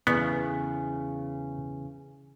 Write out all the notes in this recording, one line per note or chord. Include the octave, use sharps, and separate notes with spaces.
E2 C#3 B3